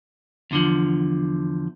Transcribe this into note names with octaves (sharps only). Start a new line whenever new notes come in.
E2 D3 F3